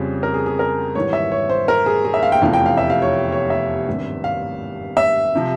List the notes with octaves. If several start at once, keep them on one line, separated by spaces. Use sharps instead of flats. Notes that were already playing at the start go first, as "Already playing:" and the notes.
Already playing: F2 C#3 G3 C4
A#4
G#4
G#4
A#4
G#1 G#2 E3 G3 C#5
E5
C#5
C5
A#4
G#4
G#4
E5
F5
G5
F1 E2 C3 F3 F5
G5
F5
E5
F5
C#5
C#5
E5
G#1 G2 G3 C4
F5
E5
C3 F3